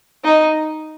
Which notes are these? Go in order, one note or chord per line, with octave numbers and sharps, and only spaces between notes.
D#4